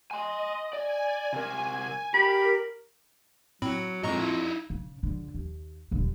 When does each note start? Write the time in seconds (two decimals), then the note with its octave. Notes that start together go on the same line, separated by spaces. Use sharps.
0.11 D#5 G#5 C6
0.73 D5 G#5
1.33 C3 A#4
2.14 G4 A#4 B5
3.62 A2 F#3 C4 B5
4.03 F2 A2 G#3 D#5 A#5 C#6
4.17 D#4 E4
4.70 C#3
5.03 C#2 D3
5.34 D#2
5.91 D#1 D3